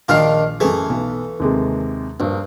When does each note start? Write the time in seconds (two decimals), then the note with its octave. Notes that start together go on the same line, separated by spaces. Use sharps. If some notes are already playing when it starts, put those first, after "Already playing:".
0.08 A#1 D#3 D4 F4 F6 C7
0.60 F#2 E3 A3 G#4
0.89 B1
1.40 D#2 C3 G#3
2.20 A#1 G2